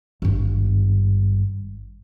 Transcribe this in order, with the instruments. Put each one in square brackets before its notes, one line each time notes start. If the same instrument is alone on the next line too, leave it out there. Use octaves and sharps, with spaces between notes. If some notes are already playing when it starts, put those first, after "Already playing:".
[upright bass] G#1 G2